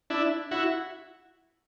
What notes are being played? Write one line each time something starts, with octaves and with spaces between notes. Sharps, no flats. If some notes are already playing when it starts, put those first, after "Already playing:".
D4 E4
E4 F#4